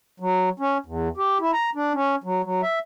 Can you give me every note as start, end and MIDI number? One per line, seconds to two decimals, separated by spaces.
0.20 0.49 54
0.60 0.78 61
0.86 1.08 40
1.17 1.38 67
1.41 1.51 64
1.53 1.70 82
1.75 1.93 62
1.94 2.16 61
2.24 2.43 54
2.43 2.61 54
2.63 2.79 76